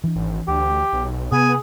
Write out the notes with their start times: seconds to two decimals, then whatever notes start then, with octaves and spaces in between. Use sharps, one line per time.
0.04 E3 D4
0.15 G#1
0.48 D2 G4
0.93 B1
1.32 C3 B3 G#4 G#5